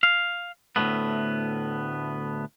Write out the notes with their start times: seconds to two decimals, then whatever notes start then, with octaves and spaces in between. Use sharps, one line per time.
0.03 F5
0.76 D2 A2 C3 A3 B3